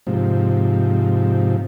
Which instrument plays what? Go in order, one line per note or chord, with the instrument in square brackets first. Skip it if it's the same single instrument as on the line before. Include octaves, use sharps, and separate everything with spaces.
[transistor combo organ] G#2 C3 F3